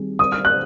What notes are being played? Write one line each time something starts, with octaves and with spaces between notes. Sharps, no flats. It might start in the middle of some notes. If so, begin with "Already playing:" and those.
Already playing: D#3 G3 C4 G#4
D#6
F6
F#6